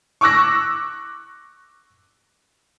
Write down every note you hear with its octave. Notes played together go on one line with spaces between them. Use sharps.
C#6 D6 E6 F#6 A#6